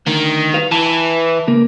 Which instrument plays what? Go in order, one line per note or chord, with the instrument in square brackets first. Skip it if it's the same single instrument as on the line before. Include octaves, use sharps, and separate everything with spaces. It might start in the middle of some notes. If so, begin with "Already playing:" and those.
[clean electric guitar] D2 [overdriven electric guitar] D#3
[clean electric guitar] G3 B4 F5
[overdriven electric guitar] E3 [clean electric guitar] A5
[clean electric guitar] C#3 A#3 A#4